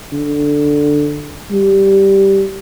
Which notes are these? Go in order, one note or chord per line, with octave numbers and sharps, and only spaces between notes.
D3
G3